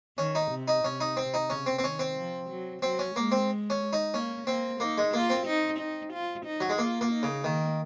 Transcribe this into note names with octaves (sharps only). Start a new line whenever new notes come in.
D#3 C#4
D#4
C3
D#4
C3 C#4
D#4
C4
D#4
C#3 C#4
C4
C4
D#3 C#4
C4
F3
F#3
F#3 C4
C#4
G#3 A#3
C4
C#4
D#4
A#3 C#4
A#3 C4
A#3 D#4
G#3
A#3 F4
C4
D#4
D#4
F4
D#4
F#3
G#3
A#3 F4
A#3
D#4
C#3
D#3 A#3